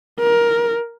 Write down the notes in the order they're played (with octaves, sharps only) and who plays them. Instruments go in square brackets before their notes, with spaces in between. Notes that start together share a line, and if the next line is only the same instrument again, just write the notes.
[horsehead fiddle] A#4